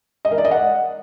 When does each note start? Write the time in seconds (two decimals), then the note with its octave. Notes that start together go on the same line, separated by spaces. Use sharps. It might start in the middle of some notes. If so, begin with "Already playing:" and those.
0.25 D#5
0.31 A#4
0.38 D5
0.45 D#5
0.51 F#5